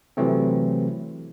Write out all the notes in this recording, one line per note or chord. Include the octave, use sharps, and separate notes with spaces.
C3 E3 F#3 A3 C4